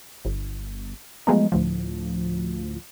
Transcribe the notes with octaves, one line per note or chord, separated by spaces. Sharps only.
G1
F3 F#3 G#3 A3 B3 D#4
D2 A2 F3